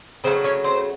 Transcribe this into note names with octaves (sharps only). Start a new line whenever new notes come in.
C#3 F#3 A3 C4 C5
C#4 C#5
C4 C5